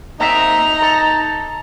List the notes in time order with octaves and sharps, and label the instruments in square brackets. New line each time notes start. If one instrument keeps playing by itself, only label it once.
[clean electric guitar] A#3 C4 E5 [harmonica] D#4 [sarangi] A#5
[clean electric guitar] A4